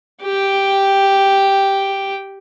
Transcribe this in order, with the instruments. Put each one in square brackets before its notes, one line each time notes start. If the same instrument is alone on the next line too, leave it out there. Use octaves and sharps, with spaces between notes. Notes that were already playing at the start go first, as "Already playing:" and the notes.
[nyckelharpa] G4 G5